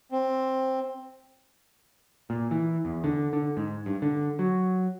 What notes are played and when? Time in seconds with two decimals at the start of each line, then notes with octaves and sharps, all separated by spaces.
0.12 C4
2.30 A#2
2.51 E3
2.85 E2
3.04 D3
3.33 D3
3.57 G#2
3.86 G2
4.02 D3
4.39 F#3